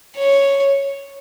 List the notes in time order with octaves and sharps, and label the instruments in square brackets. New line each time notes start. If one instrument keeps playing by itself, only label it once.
[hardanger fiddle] C#5